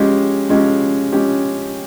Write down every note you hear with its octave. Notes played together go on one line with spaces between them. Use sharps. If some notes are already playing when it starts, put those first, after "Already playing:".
Already playing: F3 G#3 C#4 G4
F3 G#3 C#4 G4
F3 G#3 C#4 G4